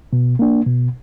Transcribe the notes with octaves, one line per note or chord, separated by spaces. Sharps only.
B2
A#3 D4
B2